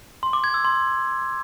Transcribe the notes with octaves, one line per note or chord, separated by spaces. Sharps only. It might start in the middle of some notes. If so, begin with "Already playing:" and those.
C6
D6
G#6
E6
C6